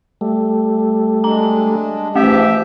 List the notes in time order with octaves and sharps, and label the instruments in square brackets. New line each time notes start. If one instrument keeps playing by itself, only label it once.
[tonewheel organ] G3 A3
[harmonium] G#3 D4 [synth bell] A#5
[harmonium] G#2 E3 F3 [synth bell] A3 [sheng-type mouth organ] G4 E5